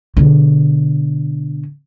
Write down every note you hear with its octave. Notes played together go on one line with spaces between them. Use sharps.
B2 D3